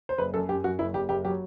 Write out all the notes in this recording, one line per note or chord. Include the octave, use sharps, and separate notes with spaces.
C5
F#1 B4
F#2 A4
F#2 G4
F#2 F#4
F#1 E4
F#1 G4
F#1 G4
F#3 G4